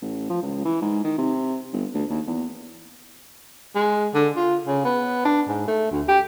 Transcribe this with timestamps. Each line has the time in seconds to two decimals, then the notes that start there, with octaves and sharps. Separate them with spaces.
0.02 A1
0.29 F3
0.42 C#2
0.65 E3
0.81 G#2
1.04 D#3
1.18 C3
1.73 G1
1.94 D2
2.09 D#2
2.27 E2
3.75 G#3
4.14 D3
4.36 F4
4.67 C#3
4.84 B3
5.25 D4
5.48 G#2
5.67 A3
5.91 D2
6.08 G4